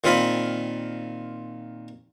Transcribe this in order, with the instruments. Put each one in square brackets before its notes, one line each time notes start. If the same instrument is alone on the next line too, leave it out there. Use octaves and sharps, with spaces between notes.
[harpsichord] A#2 D#3 C4 F4 B5